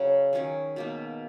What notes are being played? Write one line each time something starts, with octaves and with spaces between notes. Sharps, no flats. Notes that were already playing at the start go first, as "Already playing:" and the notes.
Already playing: C#3 F#3 C#4
D#3 F#3 C#4 G#4
B2 A#3 D#4